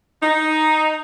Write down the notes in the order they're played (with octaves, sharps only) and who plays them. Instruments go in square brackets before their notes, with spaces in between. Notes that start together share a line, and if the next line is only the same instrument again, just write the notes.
[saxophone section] D#4